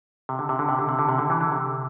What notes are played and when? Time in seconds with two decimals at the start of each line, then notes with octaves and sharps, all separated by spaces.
0.29 C3
0.39 D3
0.49 C3
0.59 D3
0.69 C3
0.79 D3
0.89 C3
0.99 D3
1.09 C3
1.18 D3
1.30 E3
1.41 D3
1.52 C3